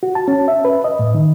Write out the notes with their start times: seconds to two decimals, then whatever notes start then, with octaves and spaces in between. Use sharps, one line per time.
0.03 F#4
0.15 A5
0.28 C#4
0.48 E5
0.65 B4
0.84 D#5
0.99 A2
1.15 D#3